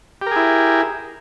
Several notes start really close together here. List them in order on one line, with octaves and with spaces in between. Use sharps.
G4 A#4 G#4 E4